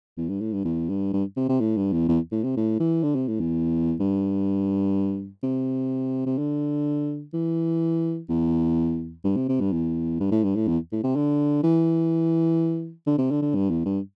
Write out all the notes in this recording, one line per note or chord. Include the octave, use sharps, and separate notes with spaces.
E2
G2
A2
G2
E2
G2
G2
C3
C3
A2
G2
E2
E2
A2
C3
A2
E3
D3
C3
A2
E2
G2
C3
C3
D3
E3
E2
G2
C3
C3
G2
E2
G2
A2
G2
A2
E2
A2
C3
D3
E3
D3
C3
D3
D3
G2
E2
G2